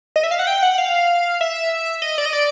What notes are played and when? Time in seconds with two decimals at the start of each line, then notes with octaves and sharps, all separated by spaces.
0.16 D#5
0.24 E5
0.31 F5
0.39 F#5
0.47 G5
0.63 F#5
0.78 F5
1.41 E5
2.02 D#5
2.18 D5
2.26 D#5
2.33 D5